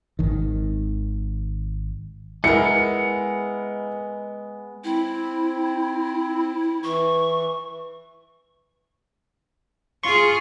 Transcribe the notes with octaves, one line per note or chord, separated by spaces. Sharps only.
G#1 D#3
G#3 B3 E4 A#4 C#7
C4 E4
E3 C#6
F4 G#4 C6 C#6